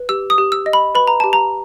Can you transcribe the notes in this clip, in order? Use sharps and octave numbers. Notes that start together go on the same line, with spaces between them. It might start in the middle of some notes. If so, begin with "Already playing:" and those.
Already playing: B4
G4 E6
D#6
G4
E6
D#5
B5
B4 B5
A#5
G4 A5
A#5